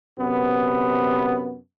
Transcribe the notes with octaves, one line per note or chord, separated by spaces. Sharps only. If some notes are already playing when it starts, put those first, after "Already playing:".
F#2 C3 B3